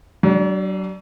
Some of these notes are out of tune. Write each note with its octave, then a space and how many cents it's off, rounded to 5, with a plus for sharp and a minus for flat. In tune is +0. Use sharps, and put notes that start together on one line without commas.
F#3 +40 D4 +0